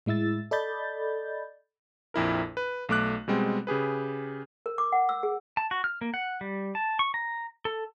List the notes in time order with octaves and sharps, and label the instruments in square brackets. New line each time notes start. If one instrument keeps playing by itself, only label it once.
[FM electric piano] A2 G#3 E4 E6 A6
A4 D5 D#5 B5 G6 A6
[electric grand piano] A#1 F2 E4 A#4
B4
B1 A3 D6 F#6
B2 G3 G#3 C4
C#3 G4 G#4 B4
[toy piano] A#4
D6
F#5
E6
G#4
[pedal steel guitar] A5
F#4
F6
A#3
F#5
G3
A5
C#6
A#5
A4